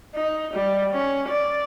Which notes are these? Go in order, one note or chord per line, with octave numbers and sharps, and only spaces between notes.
D#4
G3
C#4
D5